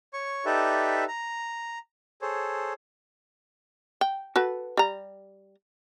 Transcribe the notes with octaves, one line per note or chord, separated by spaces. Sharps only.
C#5 C#6
D#4 G4 A4 B4 D5 E5
A#5
G#4 A4 C5 C#5
G5
F#4 A4 B4
G3 A#5